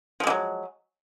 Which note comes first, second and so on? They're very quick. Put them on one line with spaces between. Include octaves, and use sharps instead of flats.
F3 G#3 D3 F#3